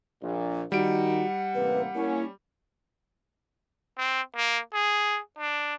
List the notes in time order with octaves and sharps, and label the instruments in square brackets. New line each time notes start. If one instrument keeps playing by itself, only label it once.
[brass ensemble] A#1 A#2
[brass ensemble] D#3 D#4 [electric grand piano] G3 D7 [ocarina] F#4 [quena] F#5
[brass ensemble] A1 C3 A#3 [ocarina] B4
[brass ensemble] A#3 C#4 [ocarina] E4
[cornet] C4
A#3
G#4
D4